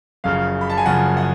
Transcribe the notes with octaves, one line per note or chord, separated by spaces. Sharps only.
F#1 F#2 C#3 F3 F5
B5
A5
G#5
F#1 F#2 C#3 F3 F#5
F#5